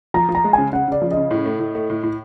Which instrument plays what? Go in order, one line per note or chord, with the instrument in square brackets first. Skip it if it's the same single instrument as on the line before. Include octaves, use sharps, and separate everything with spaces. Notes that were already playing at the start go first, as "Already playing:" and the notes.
[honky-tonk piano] F3 [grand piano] A#5
[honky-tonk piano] F3
[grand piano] A#5
[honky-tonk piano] G#3
[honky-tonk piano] C#3 [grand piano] G#5
[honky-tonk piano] C#3 [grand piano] F#5
[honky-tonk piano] C#3 [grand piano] D5
[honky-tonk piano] F3
[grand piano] D#5
[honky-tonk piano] C#3
A2
A3
A2
A3
A2
A2